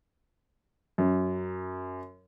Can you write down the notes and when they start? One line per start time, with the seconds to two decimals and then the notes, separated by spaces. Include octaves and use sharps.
0.98 F#2